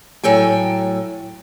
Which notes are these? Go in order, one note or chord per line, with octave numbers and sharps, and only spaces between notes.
A2 F#3 A4 G5 G#5